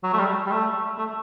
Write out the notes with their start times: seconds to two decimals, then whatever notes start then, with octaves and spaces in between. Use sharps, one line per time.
0.04 F#3
0.13 A3
0.19 G3
0.46 G3
0.52 A3
0.98 A3